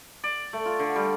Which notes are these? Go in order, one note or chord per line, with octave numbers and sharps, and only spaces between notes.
D5
A3
F4
D3
G3